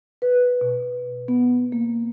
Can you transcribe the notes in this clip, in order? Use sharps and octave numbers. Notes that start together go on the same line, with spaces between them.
B4
B2
B3
A#3